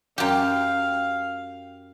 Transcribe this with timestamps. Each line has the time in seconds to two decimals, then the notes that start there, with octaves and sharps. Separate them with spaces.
0.18 F#2 G4 F5